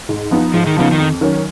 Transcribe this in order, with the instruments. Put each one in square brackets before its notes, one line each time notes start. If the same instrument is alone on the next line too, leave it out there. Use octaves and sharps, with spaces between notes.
[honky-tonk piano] G#2
F3 B3 D#4
[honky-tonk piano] G#2 [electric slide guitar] F3
[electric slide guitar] D#3
[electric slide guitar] C#3 [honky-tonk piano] F3 B3 D#4
[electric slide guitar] D#3
[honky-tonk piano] F2
D#3 F#3 C#4